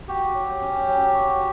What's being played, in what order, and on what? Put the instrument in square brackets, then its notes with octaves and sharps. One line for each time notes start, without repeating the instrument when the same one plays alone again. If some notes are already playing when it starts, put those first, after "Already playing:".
[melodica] F#4 G4
F#3
C#4
F#3
F#4